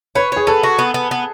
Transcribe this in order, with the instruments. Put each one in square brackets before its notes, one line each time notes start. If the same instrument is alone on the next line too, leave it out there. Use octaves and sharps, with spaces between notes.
[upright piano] B4 [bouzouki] C#5
[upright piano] G#4 [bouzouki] C#5
[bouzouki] B3 [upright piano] A4
[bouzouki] F#4
B3
B3
B3